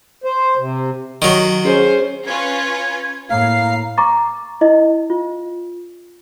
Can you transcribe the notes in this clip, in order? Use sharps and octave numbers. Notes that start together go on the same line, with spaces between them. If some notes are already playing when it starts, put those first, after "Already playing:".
C5
C3
D#3 F#3
C#4 G#4 C5
C#4 F4 B4 G#6
A2 A#3 F5 A#5 C7
A#5 C#6 D6 A6
E4 D#5
F4